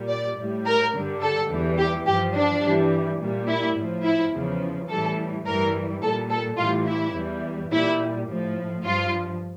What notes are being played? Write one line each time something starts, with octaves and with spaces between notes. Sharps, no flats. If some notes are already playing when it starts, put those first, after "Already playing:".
Already playing: A#2 G3
D5
A2 G3
A#4
G2 D3 G3
A4
E2 E3 G3
G4
G2 F3 G4
D4
G2 E3 G3
A#2 G3
E4
A2 F3
E4
E2 C#3 F3
A2 E3 G3 A4
G2 E3 G3 A#4
A#2 G3 A4
A4
A2 E3 G3 F4
E4
E2 E3 G3
A#2 G3 E4
A2 F3
G2 F3 F4